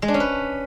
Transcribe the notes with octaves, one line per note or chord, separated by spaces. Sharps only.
G#3
D4
C#4
B4